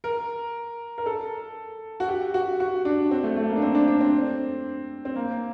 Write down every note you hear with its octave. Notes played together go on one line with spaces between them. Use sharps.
A#4
A#4
A4
F#4
G4
F#4
F#4
D4
C4
A3
A3
A#3
D4
C4
D4
D4
C4
C4
A#3